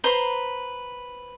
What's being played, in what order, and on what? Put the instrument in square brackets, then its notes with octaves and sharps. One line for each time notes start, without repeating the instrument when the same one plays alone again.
[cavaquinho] B4 C5 A#5 C6